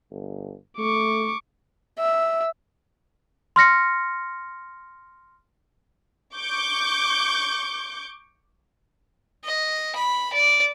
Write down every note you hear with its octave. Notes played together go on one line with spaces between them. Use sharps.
G1
A3 C#6 D6
E5
C6 F6 A#6 C#7
C#6 D6 G6
D#5
B5
D5